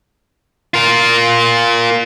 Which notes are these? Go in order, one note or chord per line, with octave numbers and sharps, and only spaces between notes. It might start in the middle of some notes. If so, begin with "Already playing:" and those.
F4 A#4